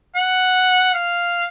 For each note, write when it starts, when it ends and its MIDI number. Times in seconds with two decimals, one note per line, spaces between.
0.16 0.93 78
0.94 1.48 77